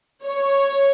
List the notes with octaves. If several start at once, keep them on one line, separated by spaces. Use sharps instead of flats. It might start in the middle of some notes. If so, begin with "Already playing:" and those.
C#5